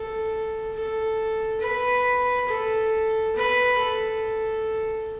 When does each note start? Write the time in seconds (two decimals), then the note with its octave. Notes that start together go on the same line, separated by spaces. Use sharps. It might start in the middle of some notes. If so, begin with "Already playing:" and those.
Already playing: A4
0.74 A4
1.61 B4
2.48 A4
3.35 B4
3.78 A4